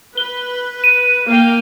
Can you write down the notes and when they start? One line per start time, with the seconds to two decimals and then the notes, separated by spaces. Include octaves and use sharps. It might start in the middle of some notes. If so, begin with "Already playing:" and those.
0.17 B4 G7
0.84 D#7
1.27 A#3 F5 G5